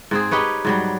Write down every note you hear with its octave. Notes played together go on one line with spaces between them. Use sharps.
G#2 C4 G#4
D#4 G4 B4 C#5
G#2 F#3 G3